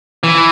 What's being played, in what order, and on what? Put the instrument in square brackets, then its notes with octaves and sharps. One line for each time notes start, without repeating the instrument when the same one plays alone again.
[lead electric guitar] E3